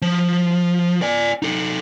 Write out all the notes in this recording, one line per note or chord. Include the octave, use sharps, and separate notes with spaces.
F3
D5 G#5
D#4 A4